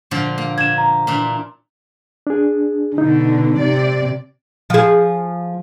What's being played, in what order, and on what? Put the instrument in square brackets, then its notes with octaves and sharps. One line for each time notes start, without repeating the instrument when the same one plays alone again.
[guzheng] A#2 D3 F3
A#3
[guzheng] D4 [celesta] G#6 E7
[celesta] A#5
[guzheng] A#2 E3 D4
[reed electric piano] D4 G#4
[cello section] B2 D3 [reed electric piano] D#4
[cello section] C3 D5
[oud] F3 G#4